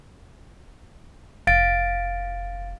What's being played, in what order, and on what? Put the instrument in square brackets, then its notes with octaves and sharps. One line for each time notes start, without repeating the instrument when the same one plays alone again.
[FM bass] F1 [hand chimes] F5 A6 D7